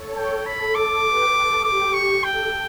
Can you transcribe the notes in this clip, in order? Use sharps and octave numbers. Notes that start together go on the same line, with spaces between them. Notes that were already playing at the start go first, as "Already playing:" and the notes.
Already playing: A4 C#5
G5
A4 B5
D6
G4 B4
A4
G4 D6
C#6
A4 G5